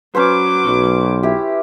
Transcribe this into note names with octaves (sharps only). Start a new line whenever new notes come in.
F#3 C#4 B4 C5 D6
B1
E4 G4